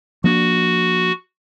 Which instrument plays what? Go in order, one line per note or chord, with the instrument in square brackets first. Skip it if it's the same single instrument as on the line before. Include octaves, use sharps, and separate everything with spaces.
[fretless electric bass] F3 A#3 D4 [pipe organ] F#4